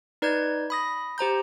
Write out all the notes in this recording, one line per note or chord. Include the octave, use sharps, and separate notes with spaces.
D#4 B4 D5 G6 G#6
B5 D#6 A#6
G4 C5 A#5 G6